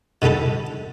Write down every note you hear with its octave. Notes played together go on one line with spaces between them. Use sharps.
B2 D3 G3 D#4 A4